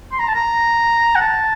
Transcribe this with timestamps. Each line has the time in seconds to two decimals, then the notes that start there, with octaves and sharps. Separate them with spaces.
0.12 C6
0.19 A#5
0.28 A5
0.34 A#5
1.15 F#5
1.21 A5